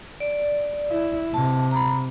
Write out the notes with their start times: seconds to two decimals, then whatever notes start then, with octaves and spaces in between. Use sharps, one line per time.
0.20 D5
0.90 E4
1.34 C3 A5
1.71 A#5 B5